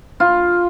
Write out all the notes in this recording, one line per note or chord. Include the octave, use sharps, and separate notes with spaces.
F4